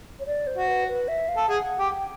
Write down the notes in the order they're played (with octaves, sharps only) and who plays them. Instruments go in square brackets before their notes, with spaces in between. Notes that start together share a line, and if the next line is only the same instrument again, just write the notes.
[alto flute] C#5
D5
C5
[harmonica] F#4
[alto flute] B4
B4
E5
F5
[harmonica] A4
[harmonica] G#4 [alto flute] F#5
[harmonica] G4 [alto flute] G5